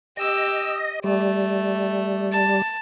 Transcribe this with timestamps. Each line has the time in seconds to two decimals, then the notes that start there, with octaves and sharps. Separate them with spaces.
0.17 G4 D#5 E6
1.04 G3 A3
2.32 A5